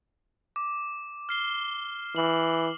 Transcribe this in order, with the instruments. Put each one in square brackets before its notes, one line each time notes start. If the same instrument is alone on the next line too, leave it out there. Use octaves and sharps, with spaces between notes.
[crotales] D6
F6 C7 G7
[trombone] E3 [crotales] F#7